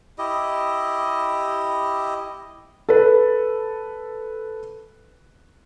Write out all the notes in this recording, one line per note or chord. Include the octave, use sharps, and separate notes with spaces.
E4 G4 D#5
A4 B4